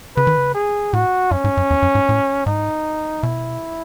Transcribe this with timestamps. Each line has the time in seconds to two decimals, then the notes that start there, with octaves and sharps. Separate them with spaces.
0.17 C#3 B4
0.27 D#3
0.37 C#3
0.55 G#4
0.93 A2 F#4
1.31 F#2 C#4
1.44 G#2
1.57 F#2
1.70 E2
1.82 F#2
1.95 G#2
2.09 A2
2.46 G#2 D#4
3.23 B2 E4